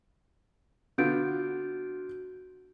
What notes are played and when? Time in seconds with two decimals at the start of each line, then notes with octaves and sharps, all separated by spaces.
0.98 D3 B3 F4 F#4 G6 D7